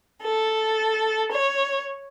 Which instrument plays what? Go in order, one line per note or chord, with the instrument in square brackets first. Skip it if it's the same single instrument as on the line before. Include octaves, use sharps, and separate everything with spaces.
[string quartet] A4
C#5